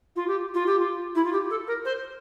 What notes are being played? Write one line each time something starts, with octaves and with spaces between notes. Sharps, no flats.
F4
G4
F4
G4
F4
E4
F4
G4
A4
A#4
C5